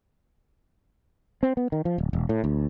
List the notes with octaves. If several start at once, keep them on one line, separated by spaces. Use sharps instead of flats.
C4
B3
D#3
F3
D1
E1
A2
D2